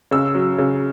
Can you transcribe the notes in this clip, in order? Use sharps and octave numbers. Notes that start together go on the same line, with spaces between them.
C#3 E6
F#3
C#3